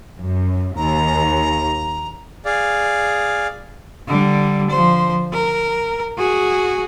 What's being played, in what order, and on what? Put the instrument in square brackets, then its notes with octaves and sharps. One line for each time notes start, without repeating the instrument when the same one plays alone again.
[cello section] F#2
[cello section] D#2 [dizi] A#5
[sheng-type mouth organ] G#4 D5 F5
[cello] D3 G3
F3 C5
A#4
F#4 G#4